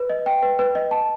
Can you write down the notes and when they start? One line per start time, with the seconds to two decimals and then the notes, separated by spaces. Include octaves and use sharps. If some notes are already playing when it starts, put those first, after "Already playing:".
Already playing: B4
0.10 D#5
0.26 G5
0.43 B4
0.59 B4
0.75 D#5
0.91 A5